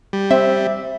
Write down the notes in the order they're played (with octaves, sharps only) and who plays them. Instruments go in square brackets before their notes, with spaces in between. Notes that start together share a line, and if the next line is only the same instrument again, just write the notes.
[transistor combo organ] G3
[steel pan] C4 [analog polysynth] E5